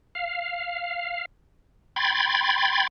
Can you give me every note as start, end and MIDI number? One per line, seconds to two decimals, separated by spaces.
0.15 1.25 77
1.96 2.87 79
1.96 2.87 83
1.96 2.87 84
1.96 2.87 92
1.96 2.87 93